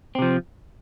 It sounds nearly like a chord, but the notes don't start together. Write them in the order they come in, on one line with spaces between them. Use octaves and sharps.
C4 C3 F3